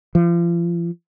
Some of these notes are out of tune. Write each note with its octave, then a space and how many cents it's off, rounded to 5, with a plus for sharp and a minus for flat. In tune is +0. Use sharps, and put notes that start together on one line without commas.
F3 -35